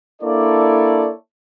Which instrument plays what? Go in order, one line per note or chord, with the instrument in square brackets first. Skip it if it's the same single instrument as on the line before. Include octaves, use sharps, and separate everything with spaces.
[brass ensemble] A#3 D4 E4 A4 C#5 D5